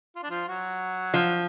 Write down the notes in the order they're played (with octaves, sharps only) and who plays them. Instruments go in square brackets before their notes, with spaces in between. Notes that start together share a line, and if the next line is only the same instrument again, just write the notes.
[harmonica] F4
D4
F3 F4
F#3 F#4
[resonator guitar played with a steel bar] F3